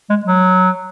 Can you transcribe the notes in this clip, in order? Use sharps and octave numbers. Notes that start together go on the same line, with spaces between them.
G#3
F#3